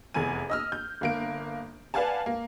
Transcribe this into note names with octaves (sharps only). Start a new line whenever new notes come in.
F1 E2 G#5 D#7
D#5 E6 F6
G6
G1 A#3 D7
B4 D5 F5 F#5 G#5 A5
A#3